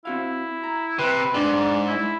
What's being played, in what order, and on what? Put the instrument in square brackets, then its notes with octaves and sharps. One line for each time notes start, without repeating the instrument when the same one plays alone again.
[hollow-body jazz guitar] C4 F#4 F5 [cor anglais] E4
[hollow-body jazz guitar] A#5
[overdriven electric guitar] C3 [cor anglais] B4
[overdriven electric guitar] G#2 [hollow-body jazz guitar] D4 [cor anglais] D5
[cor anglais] E4